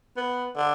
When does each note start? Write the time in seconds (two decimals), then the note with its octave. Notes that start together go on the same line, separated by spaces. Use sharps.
0.17 B3
0.57 D3